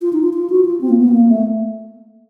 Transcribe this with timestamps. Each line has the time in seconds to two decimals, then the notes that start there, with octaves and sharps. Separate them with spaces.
0.02 F4
0.13 D#4
0.23 F4
0.33 F4
0.50 F#4
0.65 F4
0.81 C4
0.89 A#3
0.97 B3
1.12 A#3
1.28 A3